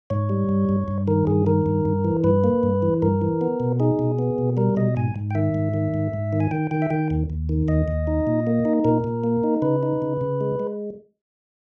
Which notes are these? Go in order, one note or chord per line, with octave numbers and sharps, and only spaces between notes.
G#2 C#5
G3
G2
G2
G2
D#3 A#4
G2 G#4
D#3 A#4
G2
G2
E3
G2 B4
A#3
G2
E3
G2 A#4
E3
B3
B2
D#4 G#4
B2
B3
B2
G3 A#4
B2 D#5
G#2 G#5
G#2
G5
D#3 E5
G#2
D#3
G#2
G#2
D#3
G#5
D#3 G5
D#3 G5
E5
D#3 G5
D#2
D#2
D#3
D#2 D#5
D#2
D#4
A#2
A#3
D#4
A#2 A#4
A#2
A#3
D#4
C#3 B4
D#4
C#3
C#3
G#3
G#3